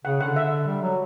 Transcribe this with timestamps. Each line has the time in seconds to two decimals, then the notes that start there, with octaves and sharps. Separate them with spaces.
0.05 C#3 F#5
0.20 D3 F#5
0.36 E5
0.66 G3
0.82 F#3